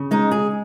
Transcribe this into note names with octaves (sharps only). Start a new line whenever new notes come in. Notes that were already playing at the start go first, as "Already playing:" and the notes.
Already playing: C#3
G#3 D#4
G#4